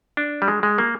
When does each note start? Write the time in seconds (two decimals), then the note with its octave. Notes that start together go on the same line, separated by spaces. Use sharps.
0.17 D4
0.42 G3
0.48 G#3
0.63 G#3
0.78 A#3